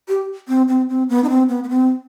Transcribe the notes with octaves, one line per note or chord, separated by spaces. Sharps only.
G4
C4
C4
C4
B3
D#4
C4
B3
B3
C4